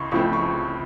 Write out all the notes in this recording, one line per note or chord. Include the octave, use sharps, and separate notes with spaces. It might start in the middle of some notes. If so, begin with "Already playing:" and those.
Already playing: C#2 C#3 C6 C#6
C#2 C#3 F3 A3 C4 C#6
C#6